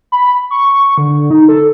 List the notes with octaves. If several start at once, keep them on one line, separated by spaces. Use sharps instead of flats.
B5
C#6
D3
D#4
A4